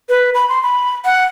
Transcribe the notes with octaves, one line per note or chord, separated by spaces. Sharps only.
B4
B5
C6
B5
F#5